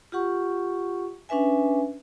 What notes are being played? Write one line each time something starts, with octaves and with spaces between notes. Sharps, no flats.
F4 G4 F#5 C#6
C#4 D4 B4 E5 G#5